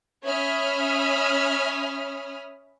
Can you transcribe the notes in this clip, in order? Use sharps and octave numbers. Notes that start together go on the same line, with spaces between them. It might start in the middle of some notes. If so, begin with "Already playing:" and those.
C#4 C#5 E5 B5 D#6 F6